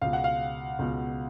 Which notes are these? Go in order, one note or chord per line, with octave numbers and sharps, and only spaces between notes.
C#2 B2 F5
F#5
F5
C#2 B2